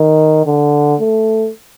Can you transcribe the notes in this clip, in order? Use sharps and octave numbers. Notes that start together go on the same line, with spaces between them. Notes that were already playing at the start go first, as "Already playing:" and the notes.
Already playing: D#3
D3
A3